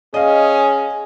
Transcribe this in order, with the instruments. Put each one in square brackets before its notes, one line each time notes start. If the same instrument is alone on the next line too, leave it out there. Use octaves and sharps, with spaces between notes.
[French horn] C#4 [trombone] G#4 [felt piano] D#5 F5